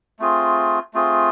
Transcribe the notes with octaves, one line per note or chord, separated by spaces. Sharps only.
A3 C4 F4 G#4
A3 C4 F4 G#4